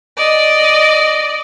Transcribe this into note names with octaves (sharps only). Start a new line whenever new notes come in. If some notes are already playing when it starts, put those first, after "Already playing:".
D5 D#5